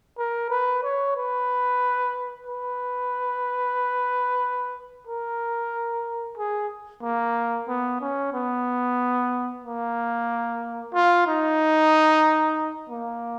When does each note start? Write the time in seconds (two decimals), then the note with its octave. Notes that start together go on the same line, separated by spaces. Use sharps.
0.18 A#4
0.50 B4
0.83 C#5
1.16 B4
2.47 B4
5.07 A#4
6.38 G#4
7.03 A#3
7.68 B3
8.01 C#4
8.33 B3
9.64 A#3
10.94 F4
11.27 D#4
12.90 A#3